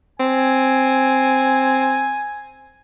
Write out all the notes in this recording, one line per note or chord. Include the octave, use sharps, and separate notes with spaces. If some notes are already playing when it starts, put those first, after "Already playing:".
C4 G#5